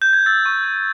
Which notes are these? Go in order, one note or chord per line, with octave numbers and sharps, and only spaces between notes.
G6
G#6
E6 A6
C#6
G6